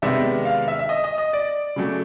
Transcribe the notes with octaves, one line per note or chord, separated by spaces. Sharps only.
C3 D#3 G#3 B3 D4 E5
F5
E5
E5
D#5
D#5
D#5
D5
C#3 F#3 A3